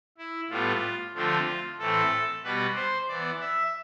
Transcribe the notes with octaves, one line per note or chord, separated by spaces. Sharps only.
E4
A2 G3 B3 F4
D3 F3 A3 C4 F4
A2 E3 A3 C4 A4
B2 G3 B3 B4
C5
E3 B3 D5
E5